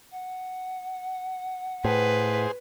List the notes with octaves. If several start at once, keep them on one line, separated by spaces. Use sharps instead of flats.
F#5
A2 G#4 B4 C5